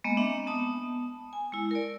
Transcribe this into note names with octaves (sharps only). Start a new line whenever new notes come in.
G#3 A#3 B3 D#5
C4 D4 D#5 E5
B3 A5 D#6
G#5
G#3 E4
A#4 D5